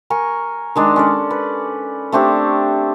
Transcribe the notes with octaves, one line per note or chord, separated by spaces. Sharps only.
A#4 G#5 C#6
D#3 G#3 D4
C#4 A4 D5
B4
A3 C4 D4 G4